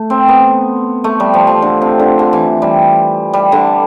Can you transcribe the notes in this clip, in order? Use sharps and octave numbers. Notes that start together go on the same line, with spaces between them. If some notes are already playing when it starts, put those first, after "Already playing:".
Already playing: A3
C4
B3
A3
G3
F3
F3
D3
C3
D3
D3
E3
G3
G3
D3